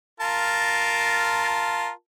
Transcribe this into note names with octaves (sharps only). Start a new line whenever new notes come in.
F4 A#4 A5